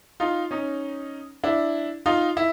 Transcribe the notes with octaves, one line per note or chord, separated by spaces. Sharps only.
D#4 F4
C#4 D#4
D4 E4
D#4 F4
E4